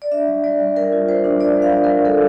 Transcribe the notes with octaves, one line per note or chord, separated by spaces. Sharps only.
D5
D4 E5
G3
G3 D5
G3
G3 A#4
F4
G3 C5
D4
G3 D5
G3
F5
D4
A#4
G3
G3 A4